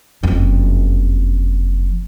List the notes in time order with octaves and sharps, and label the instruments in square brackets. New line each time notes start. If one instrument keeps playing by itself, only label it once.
[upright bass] F#1 F2